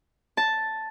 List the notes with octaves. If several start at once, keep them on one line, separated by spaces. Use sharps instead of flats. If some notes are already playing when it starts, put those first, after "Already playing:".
A5